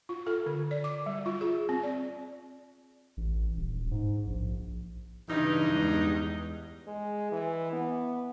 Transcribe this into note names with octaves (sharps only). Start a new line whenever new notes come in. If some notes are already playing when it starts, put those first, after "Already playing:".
F4
A4
D3
D5
D6
G3
F4
G#4
C4
D5
A1
D#1
G#2
A#1
G2 C#3 E3 D#4
E2 G#3
G#3
E3
B3